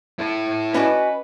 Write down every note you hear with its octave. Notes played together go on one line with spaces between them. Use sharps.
E4 A4
C#4 F#4 B4 D5 D#5 G#5